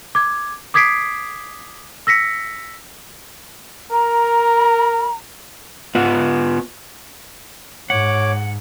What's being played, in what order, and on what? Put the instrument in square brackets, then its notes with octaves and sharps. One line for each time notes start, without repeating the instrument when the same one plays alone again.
[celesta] D6 G#6
D6 D#6 G#6 B6 C7 D7
E6 A#6 B6 C#7
[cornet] A#4 [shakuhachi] A#5
[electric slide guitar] B3 F4 B4 F#5
[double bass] G#2 [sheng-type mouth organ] C#5 D6 [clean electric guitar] F#5